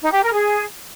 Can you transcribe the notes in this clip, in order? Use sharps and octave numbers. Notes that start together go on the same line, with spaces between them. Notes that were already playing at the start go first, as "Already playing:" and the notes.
D#4
G4
A#4
G#4